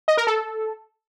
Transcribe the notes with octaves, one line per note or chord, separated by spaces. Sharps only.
D#5
A#4
A4